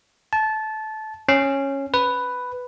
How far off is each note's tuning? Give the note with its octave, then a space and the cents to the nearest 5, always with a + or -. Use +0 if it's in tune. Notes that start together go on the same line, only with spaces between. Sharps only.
A5 -20
C#4 -10
B4 +5